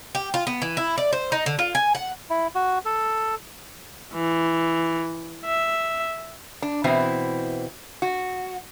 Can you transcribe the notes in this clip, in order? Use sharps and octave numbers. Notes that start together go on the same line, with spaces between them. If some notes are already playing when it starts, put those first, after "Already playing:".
G4
F4
B3
E3
E4
D5
C5
D#4
D3
F4
G#5
F#5
E4
F#4
A4
E3
E5
D4
B2 E3 C4 E4
F#4